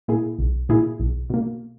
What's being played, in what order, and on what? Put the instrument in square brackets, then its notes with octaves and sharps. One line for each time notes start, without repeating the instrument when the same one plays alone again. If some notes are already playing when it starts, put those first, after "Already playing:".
[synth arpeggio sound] A#2 A#3 E4 G#4
B1
A#2 A#3 E4 G#4
B1
B2 A#3